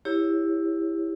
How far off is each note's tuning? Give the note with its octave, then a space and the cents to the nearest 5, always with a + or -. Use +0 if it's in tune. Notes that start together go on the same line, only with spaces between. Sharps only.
E4 +0 G4 +25 C#5 -5